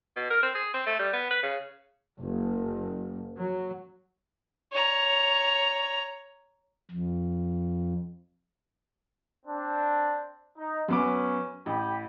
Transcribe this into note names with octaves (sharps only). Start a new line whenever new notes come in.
B2
A#4
C4
G#4
C4
A3
G3
B3
B4
C#3
F#1
F#3
C#5 A#5
F2
C4 D4
D#4
F#2 B3 C#4 D6
A1 G4 G5 B5